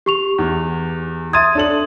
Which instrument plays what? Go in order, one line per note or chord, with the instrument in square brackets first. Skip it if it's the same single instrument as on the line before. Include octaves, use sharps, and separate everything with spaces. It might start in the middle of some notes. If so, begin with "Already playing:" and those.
[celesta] G4 C#6 F7
[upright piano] E2 E3
[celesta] E5 C6 G#6 [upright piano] D#6 A6 D#7
[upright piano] D4 A4 F#7